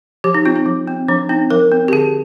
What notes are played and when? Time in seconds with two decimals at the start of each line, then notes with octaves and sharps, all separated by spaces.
0.24 F3 G4
0.34 D#4
0.45 C4 F4
0.56 D#4
0.66 F3
0.88 C4
1.08 F3 D4
1.29 C4 D#4
1.50 F3 A#4
1.71 C4
1.88 G4
1.92 D3 G#4